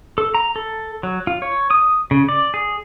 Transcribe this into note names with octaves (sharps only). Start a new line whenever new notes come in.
A4
A#5
A4
F#3
F4
C#5
D#6
C#3
D5
G#4